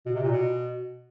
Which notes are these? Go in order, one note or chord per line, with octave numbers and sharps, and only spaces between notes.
B2
C3
A#2
B2